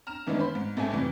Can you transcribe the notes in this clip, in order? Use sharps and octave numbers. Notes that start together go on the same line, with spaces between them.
A#5 F6 E7
F#2 D#3 E3 G#3 B3 D4
C5 B5
G#2
A1 G#2 A3 C4 G#5
F2 C3 E3 G3